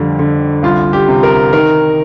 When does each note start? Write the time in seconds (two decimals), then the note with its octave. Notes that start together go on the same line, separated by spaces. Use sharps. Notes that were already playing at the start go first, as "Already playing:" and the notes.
Already playing: F2 D3 G3
0.19 D3
0.63 C2 F4
0.93 G4
1.08 C3
1.23 A#4
1.53 D#3 A#4